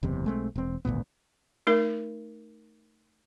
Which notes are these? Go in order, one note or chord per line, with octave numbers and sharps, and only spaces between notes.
F#1 E2 C3
B1 G#3 A3 C4
E1 C4
G#1 D2 A#2 B3
A3 D#4 A#4